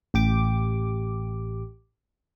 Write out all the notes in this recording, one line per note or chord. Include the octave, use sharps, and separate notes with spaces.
A1 G4 D6